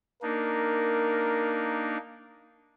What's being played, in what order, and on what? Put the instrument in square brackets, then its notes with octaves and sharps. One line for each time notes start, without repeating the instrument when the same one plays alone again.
[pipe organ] A#3 D4 D#4 [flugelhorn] A#4